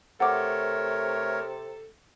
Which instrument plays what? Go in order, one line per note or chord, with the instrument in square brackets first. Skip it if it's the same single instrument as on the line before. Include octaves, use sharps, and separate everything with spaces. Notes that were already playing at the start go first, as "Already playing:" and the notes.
[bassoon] C3 [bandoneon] A3 A#4 C#5 [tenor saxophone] A4 [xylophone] F#5 D6